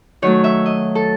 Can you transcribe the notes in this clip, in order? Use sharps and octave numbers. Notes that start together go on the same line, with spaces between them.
D#3 F#3 A3 C#5
E5
D#5
A4